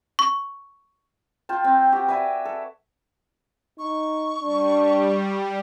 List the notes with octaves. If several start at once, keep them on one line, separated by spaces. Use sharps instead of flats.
C#6
F4 G5 A5
C4
F#4 G4
B4 D5 E5 G#5
A4
D#4 C#6
G3 D4